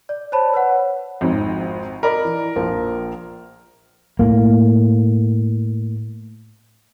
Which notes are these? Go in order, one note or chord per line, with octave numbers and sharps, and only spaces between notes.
D5
C5 C#5 A5 B5
B4 C#5 F#5
G#1 F2 G#2
A#4 D5 D#5 B5
E3
A#1 F3 A#3
A2 A#3